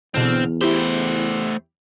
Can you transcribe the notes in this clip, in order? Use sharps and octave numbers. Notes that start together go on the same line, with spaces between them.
E2 B2 D3 C4 F6
A3 E4 G4 C5